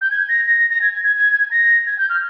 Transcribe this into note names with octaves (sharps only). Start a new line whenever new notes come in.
G6
G#6
A#6
A#6
A#6
G#6
G#6
G#6
G#6
G#6
A#6
G#6
G6
F6